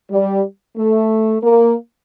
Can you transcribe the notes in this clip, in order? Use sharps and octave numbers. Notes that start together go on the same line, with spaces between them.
G3
A3
A#3